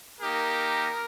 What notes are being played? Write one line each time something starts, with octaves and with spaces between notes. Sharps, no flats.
A#3 D#4 G4 A#4